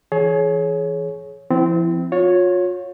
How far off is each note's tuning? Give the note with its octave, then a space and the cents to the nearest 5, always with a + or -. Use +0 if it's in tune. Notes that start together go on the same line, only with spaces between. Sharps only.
E3 +5 G#4 +35 C#5 +0
F3 -35 C4 -20 E4 +5
F4 +40 C#5 +0